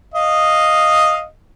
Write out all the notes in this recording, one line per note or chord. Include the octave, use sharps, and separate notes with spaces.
D#5 F5